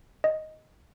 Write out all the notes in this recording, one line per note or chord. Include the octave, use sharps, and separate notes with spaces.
D#5